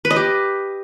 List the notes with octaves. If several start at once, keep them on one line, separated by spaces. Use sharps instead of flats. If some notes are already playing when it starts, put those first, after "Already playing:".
B4
D#5
G4